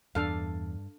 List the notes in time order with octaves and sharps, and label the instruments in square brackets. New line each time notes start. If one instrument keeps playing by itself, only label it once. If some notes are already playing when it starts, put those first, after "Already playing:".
[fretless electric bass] E2 [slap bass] G2 [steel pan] D4 A4 F5